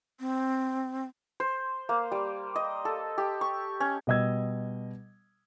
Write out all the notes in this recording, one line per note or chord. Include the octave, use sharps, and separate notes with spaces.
C4
C5
A#3
G3
D#5
A4
G4
C#6
C#4
B2 G3 D#5 E6 G#6